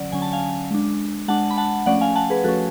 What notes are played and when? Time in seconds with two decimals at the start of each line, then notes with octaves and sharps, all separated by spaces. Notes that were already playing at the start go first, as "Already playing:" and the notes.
Already playing: D3 F#3 C#4 D5 F#5
0.12 D3 F#3 C#4 G#5
0.22 A5
0.33 F5 G#5
0.71 G#3 D4
1.28 G#3 D4 F#5 A5
1.51 B5
1.57 F#5 A5
1.86 F3 A3 C#4 D5 F#5
2.01 F5 G#5
2.15 F#5 A5
2.30 G#4 B4
2.44 F3 A3 C#4 F#4 A4